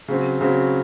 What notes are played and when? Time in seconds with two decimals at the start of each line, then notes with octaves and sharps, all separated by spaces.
0.08 C#3 F#3 C4
0.41 C#3 F#3 C4